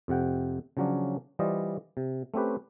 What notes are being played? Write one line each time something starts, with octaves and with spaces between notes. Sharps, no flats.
F2 C3 F#5 G5
C#3 F3 F#3 C#4 D4
E3 G3 F4 C5 D5 D#5
C3
A3 C4 C#4 G4 B4